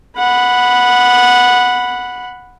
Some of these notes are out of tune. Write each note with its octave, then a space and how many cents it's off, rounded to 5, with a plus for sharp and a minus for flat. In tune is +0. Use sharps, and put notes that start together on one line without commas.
F#5 -10 B5 +0